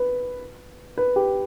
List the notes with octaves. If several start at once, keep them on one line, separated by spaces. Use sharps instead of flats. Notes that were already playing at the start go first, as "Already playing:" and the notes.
Already playing: B4
B4
G4